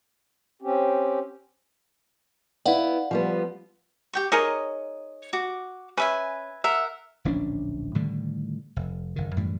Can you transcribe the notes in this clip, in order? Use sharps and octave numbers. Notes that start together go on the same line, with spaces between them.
C4 C#4 G4
B3 E4 D5 F5 F#5
F3 G3 B3
G4 G5 C#6
D#4 G#4 A#4 C#5 D#5
F#4 D6
C#4 B4 E5 G#5
A#4 E5 F#5
D1 A#1 C#4 D4
A2 D3 D#3 G3
F1
F#1 D#3
F#2 A2 E3 G3